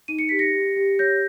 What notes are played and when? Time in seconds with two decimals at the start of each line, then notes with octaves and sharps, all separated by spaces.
0.08 D#4 D#7
0.19 C#7
0.29 G4 B6
0.39 A#6 C#7
0.54 G4
0.76 G4
0.99 C#5 G6 A#6